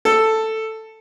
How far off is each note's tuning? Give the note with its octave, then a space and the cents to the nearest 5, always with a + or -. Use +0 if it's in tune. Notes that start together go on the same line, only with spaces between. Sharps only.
A4 +5